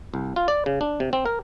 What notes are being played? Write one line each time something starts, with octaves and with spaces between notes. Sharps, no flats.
C2
F4
D5
C#3
D4
C3
C4
A#4